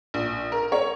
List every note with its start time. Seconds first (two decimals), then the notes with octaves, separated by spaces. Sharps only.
0.14 A#1
0.52 A#4
0.72 C#5